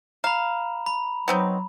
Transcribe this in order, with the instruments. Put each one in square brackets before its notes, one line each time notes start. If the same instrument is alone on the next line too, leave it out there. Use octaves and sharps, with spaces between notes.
[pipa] F5 [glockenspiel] A#5 B5
[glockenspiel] B5
[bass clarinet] F#3 [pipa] B3 C4 D#4